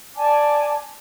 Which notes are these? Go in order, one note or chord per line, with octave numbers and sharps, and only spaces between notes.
D5 G#5 A5 D6